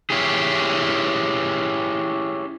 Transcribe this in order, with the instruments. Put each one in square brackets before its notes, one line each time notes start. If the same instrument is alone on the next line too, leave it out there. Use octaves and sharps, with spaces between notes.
[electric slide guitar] C#4 E4 G4 G#4